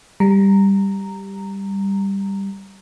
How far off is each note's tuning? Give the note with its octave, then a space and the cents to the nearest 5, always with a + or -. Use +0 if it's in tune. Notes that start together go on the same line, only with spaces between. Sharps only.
G3 +5 A#5 -10